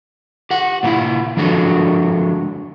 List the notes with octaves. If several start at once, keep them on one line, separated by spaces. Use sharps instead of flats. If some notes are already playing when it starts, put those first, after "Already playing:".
G4 F#5
A#2 D#3 D#4 E4 F5
F3 G#3 D4 F#4 A4